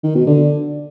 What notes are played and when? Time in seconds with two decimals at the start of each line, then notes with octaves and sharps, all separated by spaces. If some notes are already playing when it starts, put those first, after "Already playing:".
0.04 D#3
0.15 B2
0.26 D3